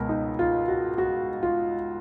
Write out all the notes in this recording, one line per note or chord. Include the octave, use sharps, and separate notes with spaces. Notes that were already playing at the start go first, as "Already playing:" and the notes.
Already playing: C#2 B2 G#3 B3 A#4
D#4
F4
F#4
F#4
F4